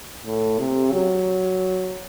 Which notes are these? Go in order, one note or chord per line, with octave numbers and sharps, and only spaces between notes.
A2
C3
F#3